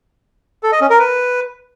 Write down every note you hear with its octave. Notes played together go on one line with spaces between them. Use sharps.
A4
D#5
C#4
A#4
B4